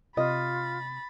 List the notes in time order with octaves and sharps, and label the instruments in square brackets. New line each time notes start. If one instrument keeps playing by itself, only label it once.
[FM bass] C3 [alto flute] F4 [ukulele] D#5 [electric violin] B5 A6